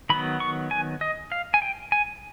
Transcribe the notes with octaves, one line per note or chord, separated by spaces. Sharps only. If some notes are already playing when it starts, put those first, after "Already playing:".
D#3 F#3 B3 B5
C#6
G#5
D#5
F5
G#5
G5
G#5